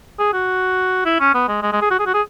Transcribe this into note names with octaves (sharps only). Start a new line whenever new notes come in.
G#4
F#4
E4
C#4
B3
G#3
G#3
G#3
G#4
F#4
G#4
F#4
G#4